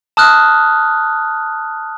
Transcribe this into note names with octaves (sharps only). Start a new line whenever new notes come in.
A5 D#6 F6 F#6